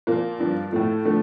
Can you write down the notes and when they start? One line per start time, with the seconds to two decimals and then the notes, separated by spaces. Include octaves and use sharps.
0.07 A#2 F3 A#3
0.40 G2 F3
0.72 A2 F3 A3
1.05 D3 F3 A3